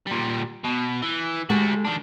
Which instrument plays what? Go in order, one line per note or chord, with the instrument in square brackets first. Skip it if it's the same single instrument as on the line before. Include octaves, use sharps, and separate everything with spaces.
[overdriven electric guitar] A#2 G3
B2
E3
[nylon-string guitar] G#3 G4 A4 [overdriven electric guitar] A3 F#4
[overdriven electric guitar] D#3 D4